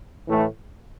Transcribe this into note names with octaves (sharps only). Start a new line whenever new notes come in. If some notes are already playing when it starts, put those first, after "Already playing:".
A2 E3 A3